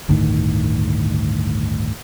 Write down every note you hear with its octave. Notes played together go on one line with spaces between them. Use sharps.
G1 D2 A2 D#3